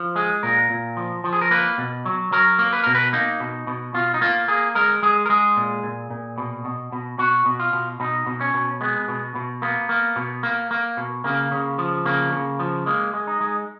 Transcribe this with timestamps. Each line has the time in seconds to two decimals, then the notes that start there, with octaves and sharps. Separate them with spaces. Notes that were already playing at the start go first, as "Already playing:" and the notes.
Already playing: F3
0.15 G#3 G#4
0.43 A#2 A#4
0.70 A#2
0.97 F3
1.24 F3
1.33 G#4
1.41 A#4
1.51 A#3 B4
1.78 B2
2.05 F#3
2.32 F#3 A#4
2.59 A#3
2.73 B4
2.83 B2 A#4
2.95 B4
3.13 A#3 D#4
3.40 B2
3.67 B2
3.94 B2 F4
4.14 D#4
4.21 A#3 F4
4.48 A#3 G#4
4.75 G#3 A#4
5.03 G#3 G#4
5.26 A#4
5.30 G#3 G#4
5.57 A#2
5.83 A#2
6.10 A#2
6.38 B2
6.65 B2
6.92 B2
7.19 B2 F#4
7.46 B2
7.60 F4
7.73 B2
8.00 B2 D#4
8.27 B2
8.41 C#4
8.54 B2
8.81 G#3 B3
9.08 B2
9.35 B2
9.62 A#3 B3
9.89 A#3
10.16 B2
10.43 A#3
10.71 A#3
10.97 B2
11.24 C#3 A#3
11.51 C#3
11.78 F3
12.05 C#3 A#3
12.32 C#3
12.59 F3
12.86 G#3 A#3
13.14 G#3
13.27 D#4
13.41 G#3